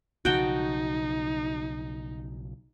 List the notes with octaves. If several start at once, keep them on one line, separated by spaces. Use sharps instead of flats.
B1 C#3 F3 D#4 F#4 G5 A5